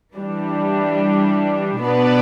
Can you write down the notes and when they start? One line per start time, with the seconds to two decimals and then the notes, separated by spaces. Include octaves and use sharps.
0.16 E3 G3 D4
1.83 B2 B3 D4 B4 D5